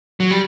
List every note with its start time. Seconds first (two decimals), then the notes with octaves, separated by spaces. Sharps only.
0.20 F#3
0.31 G3